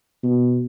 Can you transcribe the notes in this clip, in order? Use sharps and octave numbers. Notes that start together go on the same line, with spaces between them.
B2